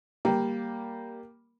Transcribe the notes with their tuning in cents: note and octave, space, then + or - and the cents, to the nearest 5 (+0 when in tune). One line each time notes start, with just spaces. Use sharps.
G3 +0 A#3 +0